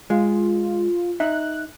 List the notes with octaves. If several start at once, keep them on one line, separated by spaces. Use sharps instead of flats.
G#3 F4
D#4 E5 F#6